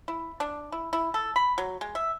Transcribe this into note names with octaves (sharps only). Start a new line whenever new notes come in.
E4
D4
E4
E4
A4
B5
F#3
G#3
E5